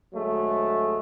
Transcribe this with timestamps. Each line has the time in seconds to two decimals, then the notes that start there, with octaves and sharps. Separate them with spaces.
0.14 D2 F#3 G#3 A3